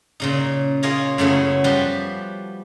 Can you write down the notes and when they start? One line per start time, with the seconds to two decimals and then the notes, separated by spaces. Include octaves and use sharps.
0.20 A#2 C#3 D#4
0.83 A#3 F4 G#4 C#5 D#5
1.18 F#2 C#3 A3 B3 C#4 E4
1.64 F3 G3 F#4 G4 B4 C6